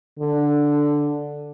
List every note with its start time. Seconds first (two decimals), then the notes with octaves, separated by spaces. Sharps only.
0.19 D3